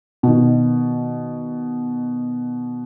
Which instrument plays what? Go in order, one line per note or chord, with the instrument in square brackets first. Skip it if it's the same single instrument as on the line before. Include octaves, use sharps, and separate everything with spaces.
[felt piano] B2 D#3